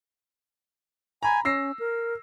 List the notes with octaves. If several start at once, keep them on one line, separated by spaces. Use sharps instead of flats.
G#5 A#5 B5
C#4 E6 A#6 C7
A#4